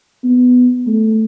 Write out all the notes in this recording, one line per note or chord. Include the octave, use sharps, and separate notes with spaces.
B3
A3